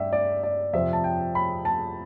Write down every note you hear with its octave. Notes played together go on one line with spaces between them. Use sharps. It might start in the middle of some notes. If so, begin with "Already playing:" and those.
Already playing: G2 D5 E5 G5
D5
D5
F2 C3 F3 E5
A5
G5
B5
A5